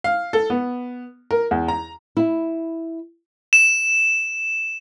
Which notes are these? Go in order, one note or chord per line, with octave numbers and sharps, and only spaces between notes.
F5
A4
B3
A#4
E2
A#5
E4 E5
E7